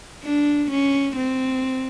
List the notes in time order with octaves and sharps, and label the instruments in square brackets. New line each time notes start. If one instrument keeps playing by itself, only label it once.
[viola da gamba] D4
C#4
C4